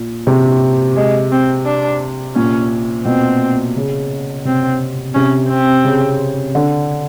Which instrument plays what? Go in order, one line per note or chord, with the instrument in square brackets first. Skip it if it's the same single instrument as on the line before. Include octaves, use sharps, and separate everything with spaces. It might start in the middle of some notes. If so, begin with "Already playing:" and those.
Already playing: [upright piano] A#2
C3
[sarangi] G#3
C4
D4
[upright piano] A#2 [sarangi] C#4
[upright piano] B2 [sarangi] C4
[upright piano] C#3
[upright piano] C3 [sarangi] C4
[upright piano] C3 [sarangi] C#4
[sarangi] C4
[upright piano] C#3
D3